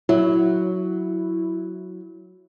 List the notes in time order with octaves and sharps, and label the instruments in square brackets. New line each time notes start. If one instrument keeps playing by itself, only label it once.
[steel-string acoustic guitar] F#3 [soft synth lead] E4